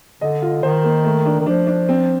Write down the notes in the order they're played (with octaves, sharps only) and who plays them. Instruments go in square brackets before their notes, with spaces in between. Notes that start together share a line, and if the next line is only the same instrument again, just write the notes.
[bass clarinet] D3 [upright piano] D#5
[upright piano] F4
[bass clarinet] D#3 [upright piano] C5
[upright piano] A#3
A3
D4
[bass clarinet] D#3
[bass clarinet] F3 [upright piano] D4
[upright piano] D4
C4